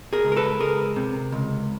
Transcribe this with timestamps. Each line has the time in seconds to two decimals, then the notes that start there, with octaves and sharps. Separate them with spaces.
0.13 G#4 A#4
0.25 C#2
0.32 A#4
0.37 A4 B4
0.60 C#2 G#4 A#4
0.96 C3
1.32 C#2